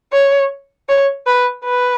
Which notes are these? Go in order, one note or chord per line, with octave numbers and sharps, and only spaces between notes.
C#5
C#5
B4
B4